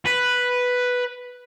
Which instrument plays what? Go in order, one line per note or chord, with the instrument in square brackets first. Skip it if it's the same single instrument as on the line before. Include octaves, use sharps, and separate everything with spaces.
[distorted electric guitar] B4